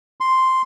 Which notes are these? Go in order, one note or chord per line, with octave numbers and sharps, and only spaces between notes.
C6